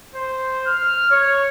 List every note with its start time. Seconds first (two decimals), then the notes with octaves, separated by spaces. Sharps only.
0.15 C5
0.67 F6
1.11 C#5